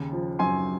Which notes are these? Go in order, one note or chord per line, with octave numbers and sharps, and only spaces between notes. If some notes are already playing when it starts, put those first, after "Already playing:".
Already playing: D#2 C#3
F3
F#2 G#5 C6